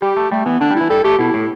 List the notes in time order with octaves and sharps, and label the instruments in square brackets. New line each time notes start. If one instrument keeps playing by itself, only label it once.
[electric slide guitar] G3 [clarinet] G4
[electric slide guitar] A3
[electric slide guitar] G3 [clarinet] A3
[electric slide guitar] E3 [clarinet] B3
[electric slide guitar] D3 [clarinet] D4
[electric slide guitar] G3
[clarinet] E4
[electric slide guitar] E3
[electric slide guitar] G3 [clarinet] A4
[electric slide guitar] A3 [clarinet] G4
[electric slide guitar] B2 [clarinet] E4
[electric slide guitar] A2